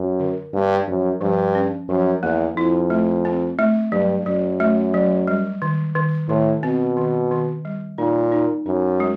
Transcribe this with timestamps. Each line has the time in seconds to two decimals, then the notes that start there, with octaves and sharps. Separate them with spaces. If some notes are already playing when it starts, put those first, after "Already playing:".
Already playing: F#2
0.19 D3
0.54 G2 A#3
0.87 F#2 F3
1.21 G2 F3
1.55 C#4
1.89 F#2 F3
2.23 E2 A#3
2.56 F2 E4
2.90 A3
3.25 C4
3.59 A3
3.92 G2 F#3
4.26 F#2 F#3
4.60 A3
4.94 F#3
5.27 G3
5.62 D#3
5.95 D#3
6.29 A2 D#3
6.63 B2 C4
6.97 D#3
7.31 D#3
7.65 G3
7.98 A#2 D#4
8.32 D#4
8.66 F#2 D#4
9.00 G#3